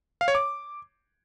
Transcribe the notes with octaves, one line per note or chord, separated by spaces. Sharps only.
F5
C#5
D6